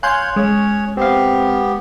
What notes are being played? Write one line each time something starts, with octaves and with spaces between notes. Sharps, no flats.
C#5 F5 G#5 C6 F#6 G6
G#3 C#4 C#5
B3 C4 G4 F5